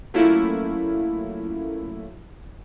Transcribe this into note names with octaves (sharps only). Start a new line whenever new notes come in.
F#3 A3 A#3 C#4 E4 F4